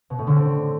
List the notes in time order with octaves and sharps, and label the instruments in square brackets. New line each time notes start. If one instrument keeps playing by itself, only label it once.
[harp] B2
A2
D3
C4